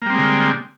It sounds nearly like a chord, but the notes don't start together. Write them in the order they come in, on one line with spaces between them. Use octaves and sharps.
A#3 G3 C4 G#3 D3